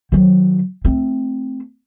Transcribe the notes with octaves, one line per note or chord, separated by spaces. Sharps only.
D#3 F#3
A3 C4